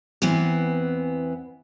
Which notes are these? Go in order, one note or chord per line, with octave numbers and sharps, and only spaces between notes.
E2 E3 B3 C4